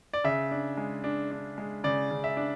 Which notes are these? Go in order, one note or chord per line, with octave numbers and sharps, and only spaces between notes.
D5
C#3 E5
D4
G#3
D4
D4
G#3
C#3 D5
C#3
E5
D4